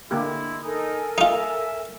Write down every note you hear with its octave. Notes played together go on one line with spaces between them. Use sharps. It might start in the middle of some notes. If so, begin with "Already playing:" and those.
D3 G#3 A#3 E4 G4
D#4 A4 A#4 G#5
D#4 F4 E5